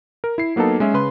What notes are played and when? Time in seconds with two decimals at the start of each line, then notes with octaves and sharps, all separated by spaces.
0.24 A#4
0.38 E4 C7
0.56 F#3 A#3 B3 D#4 A4
0.80 G#3 C#4 E5
0.94 C#3 B4 C6